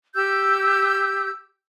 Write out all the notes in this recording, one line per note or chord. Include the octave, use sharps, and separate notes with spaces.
G4 E6 G6